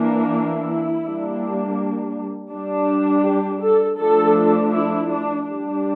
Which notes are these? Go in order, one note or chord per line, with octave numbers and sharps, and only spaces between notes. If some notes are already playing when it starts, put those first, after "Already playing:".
Already playing: E3 A#3 D4
E4
G3 A#3 D4
G3 D4
G4
A4
F3 A3 D4 A4
E4
D4
G3 D4